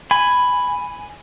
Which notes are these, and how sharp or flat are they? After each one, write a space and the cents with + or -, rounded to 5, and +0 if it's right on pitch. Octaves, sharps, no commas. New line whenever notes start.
G#5 +0 B5 +5